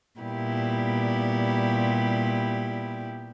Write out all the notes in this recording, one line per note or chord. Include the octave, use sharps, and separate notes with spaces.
A#2 G3 B3 E4 G4